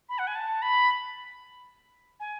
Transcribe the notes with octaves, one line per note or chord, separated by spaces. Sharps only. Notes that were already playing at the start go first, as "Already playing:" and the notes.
B5
F#5
G#5
A5
B5
G#5